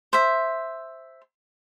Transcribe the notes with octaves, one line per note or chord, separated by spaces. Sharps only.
C5 E5